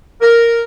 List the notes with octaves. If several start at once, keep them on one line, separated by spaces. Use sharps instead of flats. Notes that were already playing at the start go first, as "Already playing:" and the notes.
A#4